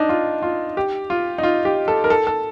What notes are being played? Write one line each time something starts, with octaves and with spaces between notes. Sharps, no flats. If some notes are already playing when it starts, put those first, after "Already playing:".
Already playing: D4 D#4
F4
F4
G4
F4
D#4
F4
G4
A4
A#4
A4
A4